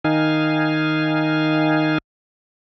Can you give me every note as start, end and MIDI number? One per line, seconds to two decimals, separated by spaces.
0.04 1.98 51
0.04 1.98 63
0.04 1.98 77
0.04 1.98 80